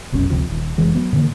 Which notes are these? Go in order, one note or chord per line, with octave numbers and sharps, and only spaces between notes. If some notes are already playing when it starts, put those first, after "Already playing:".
F1 B1 F#2 C#4
G1 D2 C3 F3
D#1
F1 E3 G#3
F#3 B3
A2 D3 E3 A#3